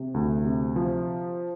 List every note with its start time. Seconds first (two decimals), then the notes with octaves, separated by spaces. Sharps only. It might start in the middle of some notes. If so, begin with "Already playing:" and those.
Already playing: C3
0.14 D2
0.45 C3
0.76 F3